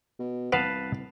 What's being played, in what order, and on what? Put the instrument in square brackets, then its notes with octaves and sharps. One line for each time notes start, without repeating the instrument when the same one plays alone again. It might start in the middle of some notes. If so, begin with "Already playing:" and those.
[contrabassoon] B2
[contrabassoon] C2 [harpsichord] B3 [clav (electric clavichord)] B4 F5 A5